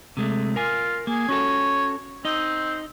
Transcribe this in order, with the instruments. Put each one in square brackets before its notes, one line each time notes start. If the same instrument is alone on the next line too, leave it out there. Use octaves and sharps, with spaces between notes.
[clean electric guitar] C3 G#3 A3
[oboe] F4 [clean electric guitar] A#4 G#5
[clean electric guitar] A#3 [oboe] G#4
[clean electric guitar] C#4 F#4 A4 [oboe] C#5
[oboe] C4 [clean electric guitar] D#4 D#5